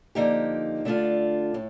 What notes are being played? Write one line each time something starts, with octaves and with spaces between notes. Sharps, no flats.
D3 F3 A#3 D#4 G4
D3 A3 D4 F4
A2